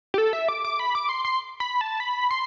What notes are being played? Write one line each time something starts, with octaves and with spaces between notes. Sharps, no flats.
G4
A4
E5
D6
D6
B5
D6
C6
C6
B5
A5
B5
C6